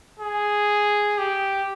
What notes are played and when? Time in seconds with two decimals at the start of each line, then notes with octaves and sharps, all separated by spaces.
0.19 G#4
1.18 G4